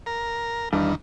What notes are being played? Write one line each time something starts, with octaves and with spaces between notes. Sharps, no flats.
A#4
E2 G2 D#3